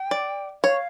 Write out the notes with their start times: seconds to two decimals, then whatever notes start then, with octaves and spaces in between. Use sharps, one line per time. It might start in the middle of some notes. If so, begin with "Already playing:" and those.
Already playing: G5
0.11 D5
0.63 C#5 F5